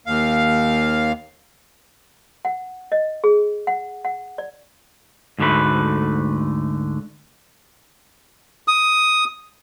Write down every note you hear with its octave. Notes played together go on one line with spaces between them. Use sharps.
D#2 F5
F#5
D#5
G#4
F#5
F#5
D5
D2 G#2 D3 A3 B4
D#6